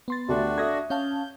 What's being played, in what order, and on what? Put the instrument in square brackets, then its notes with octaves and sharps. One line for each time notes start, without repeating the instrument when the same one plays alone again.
[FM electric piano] B3 C6 A6
[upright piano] D2 A3 G4 [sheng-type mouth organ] D4 F#4
[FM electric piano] A4 A#6 [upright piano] E5 D#6 G#6
[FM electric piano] C#4 F5 A5 [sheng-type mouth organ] G6